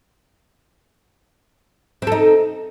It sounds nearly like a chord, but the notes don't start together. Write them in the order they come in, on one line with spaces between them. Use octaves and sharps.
C4 A4 D#4